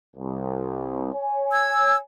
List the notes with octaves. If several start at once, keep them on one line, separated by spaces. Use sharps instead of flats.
C2
C#5 G#5
E6 G#6